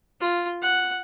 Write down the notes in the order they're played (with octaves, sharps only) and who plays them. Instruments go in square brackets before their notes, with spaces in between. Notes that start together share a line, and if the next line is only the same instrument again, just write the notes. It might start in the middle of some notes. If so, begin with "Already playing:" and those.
[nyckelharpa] F4
F#5